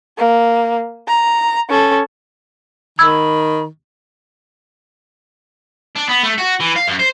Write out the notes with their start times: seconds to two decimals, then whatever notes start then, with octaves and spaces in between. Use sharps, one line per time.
0.18 A#3
1.08 A#5
1.70 C#4 A4
2.99 D#3 B5 E6 G#6
5.96 D4
6.09 B3
6.23 A3
6.38 F#4
6.60 E3
6.76 F5
6.88 F#2
6.99 C5